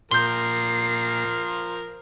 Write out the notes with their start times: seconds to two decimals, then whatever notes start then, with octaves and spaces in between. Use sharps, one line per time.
0.11 A#2 F3 A#4 C6 G6 C7